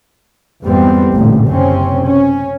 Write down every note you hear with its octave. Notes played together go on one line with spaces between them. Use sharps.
F2 G#2 E3 G3 B3 C4
A1 A#2 D3
F#1 C3 C4 C#4
C#4